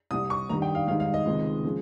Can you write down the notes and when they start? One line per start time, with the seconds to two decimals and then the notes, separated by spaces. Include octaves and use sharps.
0.11 C2 C3 G3 D#6
0.30 C#6
0.50 G2 D#3 G3 A#5
0.62 G5
0.75 F5
0.87 G#2 D#3 G3 F5
1.00 F5
1.14 D#5
1.26 C#2 C3 D#3 G#3
1.64 C#3 F3 G#3